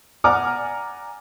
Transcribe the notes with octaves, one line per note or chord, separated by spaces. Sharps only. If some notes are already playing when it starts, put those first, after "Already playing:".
D5 F#5 G#5 A#5 D6 F6